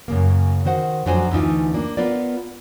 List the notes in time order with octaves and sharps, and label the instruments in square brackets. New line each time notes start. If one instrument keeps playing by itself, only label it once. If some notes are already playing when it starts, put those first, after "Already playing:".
[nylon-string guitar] F#2 C#3 A#3
D#3 F#4 C5 F#5
F2 F#3 D4 F#4 C5 G#5
D2 E3 C#4 D#4 F4
A#3 D4
B3 F4 A#4 D5